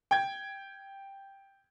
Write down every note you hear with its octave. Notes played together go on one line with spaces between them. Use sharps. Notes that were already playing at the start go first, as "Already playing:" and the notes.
G5 G#6